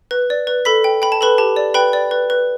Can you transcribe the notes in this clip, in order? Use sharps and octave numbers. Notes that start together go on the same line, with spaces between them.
B4
D5
B4
A4 B5 B6
G5
G5 B5
A5
A4 B4 B5
G4 A5
D5
B4 G5 B5
D5
B4
B4